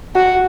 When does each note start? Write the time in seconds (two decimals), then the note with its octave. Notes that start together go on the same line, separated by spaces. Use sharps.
0.16 F#4